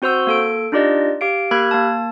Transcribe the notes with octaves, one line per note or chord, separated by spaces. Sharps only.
C4 F#4 C5 C6 E6 G6
A#3 A4 D7
D4 D#4 F4 G4 D5 D#5
G4 F5 D7
A#3 G4 A#4 B5 F#6 G#6
A#3 A5